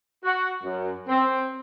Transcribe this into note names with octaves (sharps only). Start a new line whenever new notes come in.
F#4
F#2
C4